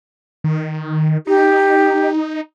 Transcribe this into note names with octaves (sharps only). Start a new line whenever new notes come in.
D#3
D#4 G4